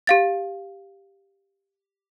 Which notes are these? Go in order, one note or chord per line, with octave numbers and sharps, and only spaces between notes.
G4 F5 A6